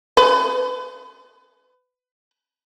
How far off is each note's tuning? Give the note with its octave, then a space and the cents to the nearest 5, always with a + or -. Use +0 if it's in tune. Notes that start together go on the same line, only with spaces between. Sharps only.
B4 +25